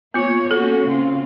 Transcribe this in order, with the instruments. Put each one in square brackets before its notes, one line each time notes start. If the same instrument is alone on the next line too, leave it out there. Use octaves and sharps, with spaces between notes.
[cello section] A#3 C#5 [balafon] B3 F4
[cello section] A#3 C#4 F#4 [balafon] A4
[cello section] C#3 C4 F4